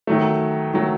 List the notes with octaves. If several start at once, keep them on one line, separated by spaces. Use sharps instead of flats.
D#3 F#3 A3
D#3 F#3 A3